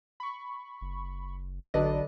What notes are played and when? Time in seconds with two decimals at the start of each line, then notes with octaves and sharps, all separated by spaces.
0.20 B5 C#6
0.81 F#1
1.74 A1 D3 F#3 D4 A4 B4 D5 D#5